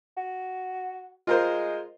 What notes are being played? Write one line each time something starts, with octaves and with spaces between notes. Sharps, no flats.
F#4
G#3 F4 A#4 C5